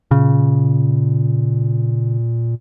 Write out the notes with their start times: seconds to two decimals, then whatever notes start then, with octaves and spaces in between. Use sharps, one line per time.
0.11 A#2 C#3